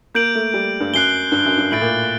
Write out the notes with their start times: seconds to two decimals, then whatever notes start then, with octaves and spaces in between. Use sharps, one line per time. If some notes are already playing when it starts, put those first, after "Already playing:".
0.14 A#3 G6 D7 F#7
0.35 A3
0.54 G3
0.80 G2
0.93 F#2 F#6 C7 G7
1.32 G2
1.45 F#2
1.58 G2
1.71 A2 A6 D7 F#7
1.81 A#2